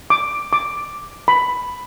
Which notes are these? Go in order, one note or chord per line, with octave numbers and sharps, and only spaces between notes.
D6
D6
B5